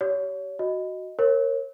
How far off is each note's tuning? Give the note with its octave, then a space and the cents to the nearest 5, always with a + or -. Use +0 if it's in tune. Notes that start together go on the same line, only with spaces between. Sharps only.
G4 -25 C#5 +30
F#4 +0 D#5 +0
A#4 +0 C#5 -30